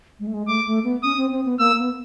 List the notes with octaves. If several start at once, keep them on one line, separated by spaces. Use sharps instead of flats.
G#3
A3
G#3
A3 D6
A3
B3
C#4 D#6
C4
C4
B3
A#3 E6
B3